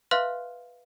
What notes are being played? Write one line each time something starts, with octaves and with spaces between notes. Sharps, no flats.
B4 E5 F5 C6 F6 F#6